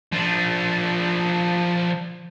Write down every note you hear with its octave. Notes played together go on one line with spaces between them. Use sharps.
F3 D4